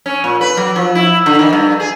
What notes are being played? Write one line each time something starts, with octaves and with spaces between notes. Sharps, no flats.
C#4
A#2
B4
F#3
F3
E4
D3
D#3
G2
G#4